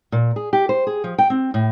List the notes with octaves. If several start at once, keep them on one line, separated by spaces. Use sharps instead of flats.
A#2
G#4
G4
C5
G#4
F3
G5
C4
A2